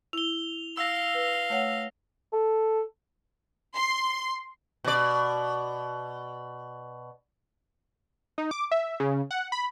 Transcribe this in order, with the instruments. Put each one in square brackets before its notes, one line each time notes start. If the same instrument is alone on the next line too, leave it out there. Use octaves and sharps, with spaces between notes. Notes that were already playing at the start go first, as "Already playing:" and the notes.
[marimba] E4 [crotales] F7 G7
[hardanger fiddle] F5 [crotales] E6 A#6
[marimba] B4
A3 C#5 F#5
[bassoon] A4
[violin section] C6
[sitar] B2 D5
[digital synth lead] D#4
D6
E5
C#3
F#5
B5